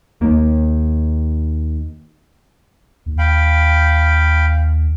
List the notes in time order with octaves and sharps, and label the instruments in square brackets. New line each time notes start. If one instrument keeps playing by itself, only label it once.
[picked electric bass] D#2 A#3
[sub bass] D#2
[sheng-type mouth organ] F5 G5 B5